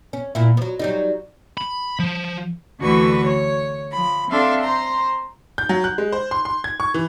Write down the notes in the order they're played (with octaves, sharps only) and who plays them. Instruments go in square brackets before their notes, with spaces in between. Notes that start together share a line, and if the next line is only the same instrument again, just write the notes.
[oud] C#4
A#2 E4
F3 F#3
F#3 G3 D#4
[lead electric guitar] B5
F3
[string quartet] D2 D3 E3 F#4 B4 C#6
C#5
F3 B5
C4 D4 A4 E5 F5 C6
C5 A#5 C6
[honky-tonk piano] G6
F#3
F#6
G#3
C5
C6
C6
G#6
C#6
E3